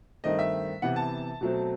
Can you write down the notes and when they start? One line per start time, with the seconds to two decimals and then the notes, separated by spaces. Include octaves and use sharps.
0.24 G2 D#3 A3 C4 D#5
0.39 E5
0.82 C3 E3 B3 F#5
0.96 A5
1.41 B2 F#3 A3 C4